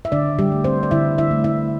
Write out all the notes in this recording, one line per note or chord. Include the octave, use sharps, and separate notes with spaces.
E5
D3 D4 D5
G3 G4
A3
C4 C5
D5
D3 E4 E5
E4 E5
A3
E4 E5